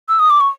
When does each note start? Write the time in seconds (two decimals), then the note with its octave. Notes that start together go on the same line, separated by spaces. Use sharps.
0.09 E6
0.19 D#6
0.30 D6
0.40 C#6